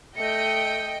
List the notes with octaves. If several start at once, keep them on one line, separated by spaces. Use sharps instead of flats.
A3 D#5 G5 C#7